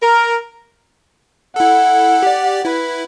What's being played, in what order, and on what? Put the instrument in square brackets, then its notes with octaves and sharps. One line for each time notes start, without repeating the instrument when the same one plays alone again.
[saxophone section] A#4
[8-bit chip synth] E4 A4 [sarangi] F#5
[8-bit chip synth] G4 D5
[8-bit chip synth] E4 [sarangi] B4